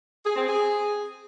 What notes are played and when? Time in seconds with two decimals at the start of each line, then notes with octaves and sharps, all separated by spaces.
0.25 G#4
0.36 C4
0.47 G#4